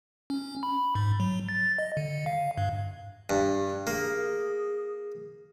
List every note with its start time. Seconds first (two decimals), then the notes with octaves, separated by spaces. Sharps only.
0.30 C#4
0.63 B5
0.95 G#2
1.20 F#3
1.49 A6
1.78 D#5
1.97 D3
2.26 F5
2.58 G2
3.30 G2
3.87 A#3 G#4